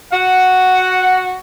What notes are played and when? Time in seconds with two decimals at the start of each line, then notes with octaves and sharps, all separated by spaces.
0.13 F#4 F#5